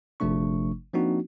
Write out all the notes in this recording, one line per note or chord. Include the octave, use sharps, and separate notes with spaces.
G1 C3 F3 A3 D4 C#6
F3 A#3 C4 D4 D#4 F#4